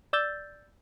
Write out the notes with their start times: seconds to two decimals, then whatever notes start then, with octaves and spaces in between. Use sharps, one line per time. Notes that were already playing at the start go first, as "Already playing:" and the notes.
0.13 D5 E6 G6 A6